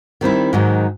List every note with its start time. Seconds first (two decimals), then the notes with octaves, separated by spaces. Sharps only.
0.21 D#3 G3 C4 E4
0.53 G#2 D#3 F#3